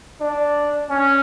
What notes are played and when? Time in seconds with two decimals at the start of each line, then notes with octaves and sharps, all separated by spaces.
0.21 D4
0.90 C#4